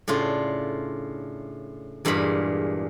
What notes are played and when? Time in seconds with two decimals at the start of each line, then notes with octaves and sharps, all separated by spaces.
0.08 A2 C#3 D4 F4
2.05 E2 G2 A#2 G#3 B5